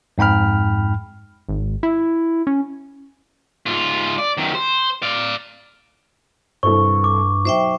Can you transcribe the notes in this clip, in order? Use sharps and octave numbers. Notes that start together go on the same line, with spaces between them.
F2 G#2 G5 B5 F6
G#1
E4
C#4
G#2 F4
D5
F#2 D#3
C5
D5 F5
C2 G2 A4 C5 C#6
D6
B1 C5 E5 G5